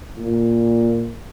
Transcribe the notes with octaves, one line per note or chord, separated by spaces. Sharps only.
A#2